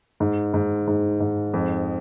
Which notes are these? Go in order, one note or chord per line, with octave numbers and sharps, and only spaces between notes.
G#2
G#2
G#2
G#2
F2